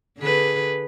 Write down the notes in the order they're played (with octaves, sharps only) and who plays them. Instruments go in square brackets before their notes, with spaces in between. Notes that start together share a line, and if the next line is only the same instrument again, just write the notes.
[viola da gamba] D3 G#4 B4